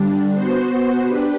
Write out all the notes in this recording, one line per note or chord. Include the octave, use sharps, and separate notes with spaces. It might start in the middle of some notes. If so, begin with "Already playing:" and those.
Already playing: D3 G3 D4
B3 F#4 C5
D4 G4 B4